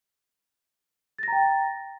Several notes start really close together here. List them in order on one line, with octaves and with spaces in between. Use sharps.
A6 A#6 A#5 G5